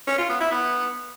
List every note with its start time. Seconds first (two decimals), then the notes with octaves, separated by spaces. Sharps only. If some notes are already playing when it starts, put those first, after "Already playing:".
0.07 C#4
0.18 F4
0.29 B3
0.40 E4
0.51 B3